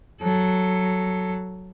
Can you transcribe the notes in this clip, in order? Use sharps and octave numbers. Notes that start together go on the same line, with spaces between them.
F#3 A4